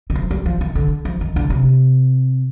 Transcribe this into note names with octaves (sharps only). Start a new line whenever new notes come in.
D#3
F3
G3
F3
D#3
D3
F3
D#3
D3
C3